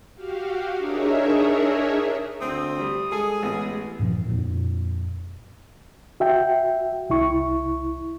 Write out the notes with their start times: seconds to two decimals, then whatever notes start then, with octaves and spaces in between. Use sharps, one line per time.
0.15 F#4 G4 F5
0.78 D4 D#4 G#4 A#4 C#5 E5
2.41 D2 C4 D#6
2.79 G3
3.12 G#3 G#4 A4
3.43 A1 B3
3.99 E2 G2 A#2 F3
4.29 F2 A#2
6.20 F#4 E5 G5
7.10 C2 E4 C#6